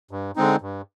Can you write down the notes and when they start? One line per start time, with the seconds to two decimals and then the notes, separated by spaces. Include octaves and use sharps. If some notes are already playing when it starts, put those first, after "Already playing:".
0.11 G2
0.36 D3 G#3 C4 D#4
0.61 G2